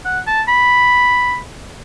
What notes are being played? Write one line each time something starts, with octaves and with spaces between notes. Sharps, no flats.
F#5
A5
B5